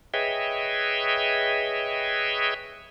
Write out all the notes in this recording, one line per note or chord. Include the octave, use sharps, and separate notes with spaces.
G#4 B4 C#5 D#5 E5 G5